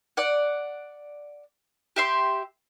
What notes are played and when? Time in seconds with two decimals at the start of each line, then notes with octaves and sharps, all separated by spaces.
0.17 D5 F#5
1.96 G4 E5 C6